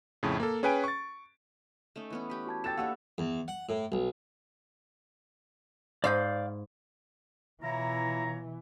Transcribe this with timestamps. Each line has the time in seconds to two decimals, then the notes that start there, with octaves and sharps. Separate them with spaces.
0.23 F2 A2 C#3
0.40 A#3 A4
0.63 C#4 G#4 B4 G5 G#5 D7
0.84 C#6 A6
1.96 A3 C#4 D#4
2.10 E3 B3 C#4
2.30 G4 B4
2.47 F#4 A5 G#6
2.64 G4 A4 G5 A6 E7
2.77 A#3 D4 G4 B4 C#5 F5 F#5 E6
3.18 E2
3.48 F#5
3.69 A2
3.92 B1
6.04 G#2 G#4 D5 F5 B5 G6
7.63 B2 E3 E4 F4 C#5 A#5